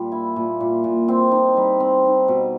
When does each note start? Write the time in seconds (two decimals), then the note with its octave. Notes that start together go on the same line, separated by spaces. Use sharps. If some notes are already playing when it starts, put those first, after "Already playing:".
Already playing: A#2 G3
0.12 E4
0.36 A#2
0.60 A#2
0.84 A#2
1.08 C4
1.32 D#4
1.57 G3
1.80 C4
2.05 D#4
2.28 B2